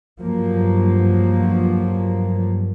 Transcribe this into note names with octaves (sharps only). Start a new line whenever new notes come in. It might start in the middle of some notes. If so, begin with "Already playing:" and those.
G2 F3 F#3 A#3